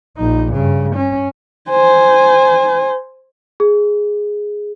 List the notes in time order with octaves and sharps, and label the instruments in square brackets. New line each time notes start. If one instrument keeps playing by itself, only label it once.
[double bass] A#1 D#4
G2 C#3
C#4
[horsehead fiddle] C5 G#5
[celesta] G#4